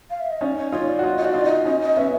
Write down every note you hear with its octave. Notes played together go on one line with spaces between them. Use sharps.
F5
E5
D#5
C#4 D#4 D5
C#5
D#4 F4 C#5
D5
F#4
D#4 F4 C#5
D#5
F#4 D5
D#4 F4
D#5
C#4 D#4 D#5
D#5
B3 C#4 E5